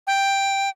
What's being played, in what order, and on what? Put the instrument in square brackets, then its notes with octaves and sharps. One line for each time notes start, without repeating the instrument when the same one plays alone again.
[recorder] G5